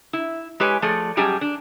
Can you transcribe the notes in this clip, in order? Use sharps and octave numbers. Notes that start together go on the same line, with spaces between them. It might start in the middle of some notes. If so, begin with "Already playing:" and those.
E4
G#3 G4 B4 C#5 G#5
F3 A3 G#4 A4 D5
F#2 G3 G4 G#4 G#5 A5
D4